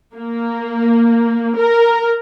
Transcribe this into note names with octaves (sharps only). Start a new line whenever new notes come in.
A#3
A#4